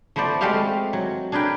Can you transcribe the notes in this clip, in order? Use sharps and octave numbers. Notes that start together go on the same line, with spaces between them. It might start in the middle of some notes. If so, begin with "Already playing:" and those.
F3 A3 B3 C5 D5
G#3 A3 C4 F#4 G4 F5
F#3
D4 G#4 A#4 B4 G5